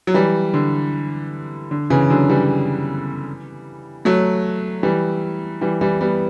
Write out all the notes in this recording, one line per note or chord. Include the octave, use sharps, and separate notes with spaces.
F#3
E3 G3
D3
D3
C#3 E3
D3 F#3
E3 G3
F#3 A3
E3 G3
E3 G3
E3 G3
G3 B3